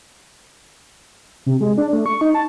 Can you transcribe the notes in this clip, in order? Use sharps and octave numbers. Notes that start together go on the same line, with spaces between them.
C3
G#3
D4
A3
C#6
D#4
A5